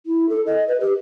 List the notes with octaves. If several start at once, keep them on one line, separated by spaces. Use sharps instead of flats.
E4
A4
D#5
B4
G4